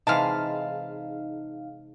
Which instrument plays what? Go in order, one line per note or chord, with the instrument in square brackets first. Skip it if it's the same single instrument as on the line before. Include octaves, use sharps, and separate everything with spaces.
[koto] C3 E3 G#3 [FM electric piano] D#4 F5 [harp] A5 F6 B6